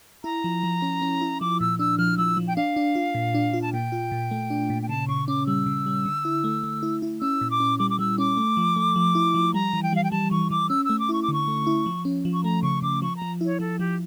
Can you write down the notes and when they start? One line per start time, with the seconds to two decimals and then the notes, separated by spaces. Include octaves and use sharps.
0.24 E4 A#5
0.44 F3
0.63 F3
0.82 C#4
1.02 C#4
1.21 E4
1.41 F3 D6
1.60 A#2 E6
1.79 D4 E6
1.98 F3 F6
2.18 F3 E6
2.37 F3
2.48 G5
2.56 D4 F5
2.76 D4
2.95 F4
3.15 A#2
3.35 D4
3.53 F4
3.62 A5
3.73 A#2 G5
3.92 F4
4.12 A#2
4.31 A3
4.50 D4
4.70 A#2
4.83 G5
4.89 C#3 A5
5.08 C#3 C#6
5.28 C#4 D6
5.47 G3 E6
5.66 C#3
5.86 G3
6.06 D3
6.25 E4
6.44 A3
6.63 A3
6.83 E4
7.02 E4
7.21 C#4 E6
7.41 A#2
7.51 D6
7.60 C#4
7.79 G3 D6
7.90 D6
7.99 G3 E6
8.18 C#4 D6
8.37 A3
8.57 F3
8.76 A3
8.96 F3
9.15 E4
9.34 F3
9.54 G3 A#5
9.73 E3
9.83 G5
9.93 G3 F5
10.04 G5
10.11 G3 A5
10.31 E3 C#6
10.50 E3 D6
10.69 C#4 E6
10.85 A3 E6
10.99 D6
11.09 E4 C#6
11.23 D6
11.28 D3 C#6
11.48 A3
11.67 E4
11.86 F3
12.05 C#4
12.25 F3
12.33 C#6
12.44 A3 A#5
12.63 C#3 C#6
12.82 C#3 D6
13.02 F3 C#6
13.17 A#5
13.22 F3
13.41 E4 C#5
13.60 F3 A4
13.79 F3 G4